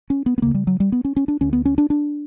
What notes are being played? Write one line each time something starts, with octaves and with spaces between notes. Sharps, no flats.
C#4
B3
B3
D2 C#3 A#3
G3
F#3
G3
B3
C#4
C#4
D4
D2 D3 C#4
B3
C#4
D4
D4